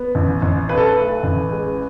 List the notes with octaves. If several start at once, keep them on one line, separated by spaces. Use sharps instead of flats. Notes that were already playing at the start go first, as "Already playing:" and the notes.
Already playing: B3
A1
A1
B1 B4
A4
B4
A3
A1
G#3